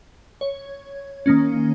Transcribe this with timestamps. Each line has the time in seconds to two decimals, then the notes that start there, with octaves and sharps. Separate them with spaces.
0.41 C#5
1.26 D#3 A#3 C#4